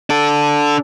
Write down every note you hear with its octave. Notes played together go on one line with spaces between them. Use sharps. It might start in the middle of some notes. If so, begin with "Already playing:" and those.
D4 A4